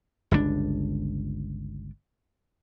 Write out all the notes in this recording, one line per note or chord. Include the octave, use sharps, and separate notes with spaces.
G1 C#2 B2 D4